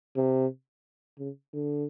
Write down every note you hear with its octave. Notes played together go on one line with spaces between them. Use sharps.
C3
C#3
D3